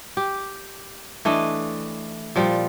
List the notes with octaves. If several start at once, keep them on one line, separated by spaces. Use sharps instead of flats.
G4
E3 A3 D4 D#5
A#2 F3 G3